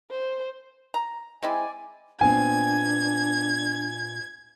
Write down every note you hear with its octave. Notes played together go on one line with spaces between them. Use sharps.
C5
A#5
G#3 C4 E4 D5 G#5
A#2 B3 C4 D4 G#5 G#6